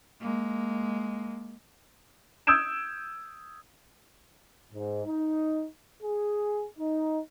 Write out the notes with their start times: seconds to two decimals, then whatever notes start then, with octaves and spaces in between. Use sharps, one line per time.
0.20 G#3 A#3
2.47 D#6 E6 G6 G#6 D7 E7
4.74 G#2
5.06 D#4
6.02 G#4
6.78 D#4